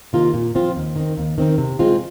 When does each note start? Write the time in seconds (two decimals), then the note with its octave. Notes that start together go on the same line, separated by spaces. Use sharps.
0.13 C3 D#3 A#3 F4
0.34 A#2
0.55 F3 C4 F4
0.76 D#2
0.96 D#3 C4
1.17 D#2
1.38 D#3 C4 D#4
1.58 C3
1.79 G#3 C4 F4